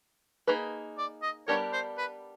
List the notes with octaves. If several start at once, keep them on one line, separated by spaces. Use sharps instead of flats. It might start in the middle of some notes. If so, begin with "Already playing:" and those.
A#3 D#4 G#4 B4
D5
D#5
G3 B3 D4 G4 A#4 C#5
C5
B4